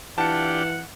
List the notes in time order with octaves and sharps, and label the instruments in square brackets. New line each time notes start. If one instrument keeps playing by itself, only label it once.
[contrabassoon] E3 [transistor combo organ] D4 F4 G4 [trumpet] F#5 [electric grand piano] A5 C#7